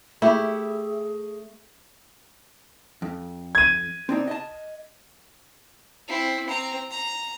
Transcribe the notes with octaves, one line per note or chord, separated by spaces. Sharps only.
A3 E4 G4 G#4
F2
G#6 D#7
C4 D4 D#4
D#5 A5
C4 E4
C4 A#5
A#5